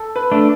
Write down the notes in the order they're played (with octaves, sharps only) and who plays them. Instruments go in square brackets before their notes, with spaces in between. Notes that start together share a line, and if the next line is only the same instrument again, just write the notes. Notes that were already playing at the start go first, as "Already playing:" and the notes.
Already playing: [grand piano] A4
B4
[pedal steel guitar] A3 D4